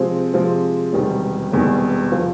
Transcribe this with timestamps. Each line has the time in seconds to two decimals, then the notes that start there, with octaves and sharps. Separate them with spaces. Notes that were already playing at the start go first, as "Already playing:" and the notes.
Already playing: C3 F3 G#3 C4
0.34 C3 F3 G#3 C4
0.93 E1 E2 C3 D#3 G3
1.52 E1 E2 C3 D#3 G3
2.12 C3 F3